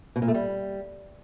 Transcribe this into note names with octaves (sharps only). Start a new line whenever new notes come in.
B2
A#2
A3
G3